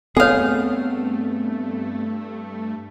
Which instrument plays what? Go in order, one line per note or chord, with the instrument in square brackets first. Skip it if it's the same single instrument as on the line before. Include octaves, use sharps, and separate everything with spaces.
[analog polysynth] G2 A3 [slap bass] B3 C4 [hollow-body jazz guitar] G#4 F5 [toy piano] A4 C#5